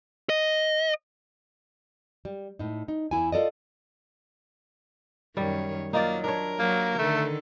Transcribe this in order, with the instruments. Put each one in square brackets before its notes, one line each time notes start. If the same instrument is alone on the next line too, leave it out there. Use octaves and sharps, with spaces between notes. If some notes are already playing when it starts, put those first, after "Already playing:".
[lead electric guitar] D#5
[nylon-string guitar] G3
A2 D#4
D#4
E2 E4 G#5
F4 A4 D5 D#5
[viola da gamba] F#2 D#3 C#5 [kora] G3
[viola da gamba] F#3 [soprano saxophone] A#3 [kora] D#4 F4 D5
[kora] D4 C#5 [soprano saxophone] A#4
[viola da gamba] F#3 [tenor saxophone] A#3
[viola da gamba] D3 D#3 A4 [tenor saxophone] A3